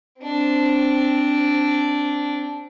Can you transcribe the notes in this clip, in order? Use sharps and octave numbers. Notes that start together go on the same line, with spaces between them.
C4 D4